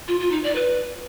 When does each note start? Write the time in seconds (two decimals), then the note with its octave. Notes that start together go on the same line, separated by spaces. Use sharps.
0.08 F4
0.20 F4
0.32 D#4
0.44 D5
0.55 B4